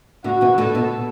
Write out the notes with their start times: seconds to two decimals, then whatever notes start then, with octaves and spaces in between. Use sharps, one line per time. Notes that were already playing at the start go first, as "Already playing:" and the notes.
0.24 A2 D3 F#4
0.41 B2 E3
0.58 A2 D3 A4
0.75 B2